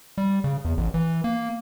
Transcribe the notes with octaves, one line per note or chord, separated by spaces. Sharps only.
G3
C#3
E2
A1
E3
A#3